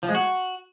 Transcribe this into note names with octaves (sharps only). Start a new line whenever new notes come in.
F3
G#3
F#4